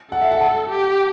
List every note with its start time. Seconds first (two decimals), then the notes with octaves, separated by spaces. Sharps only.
0.12 A4 F#5
0.21 E5
0.32 F#5
0.41 A5
0.69 G4